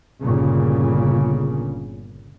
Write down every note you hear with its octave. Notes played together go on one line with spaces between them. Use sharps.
G1 A#2 C#3